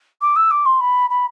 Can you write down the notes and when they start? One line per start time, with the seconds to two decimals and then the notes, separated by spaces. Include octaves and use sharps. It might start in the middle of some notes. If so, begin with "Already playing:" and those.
0.21 D6
0.36 E6
0.51 D6
0.65 C6
0.80 B5
1.10 B5